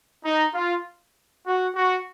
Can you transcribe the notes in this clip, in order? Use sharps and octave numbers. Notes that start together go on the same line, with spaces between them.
D#4
F4
F#4
F#4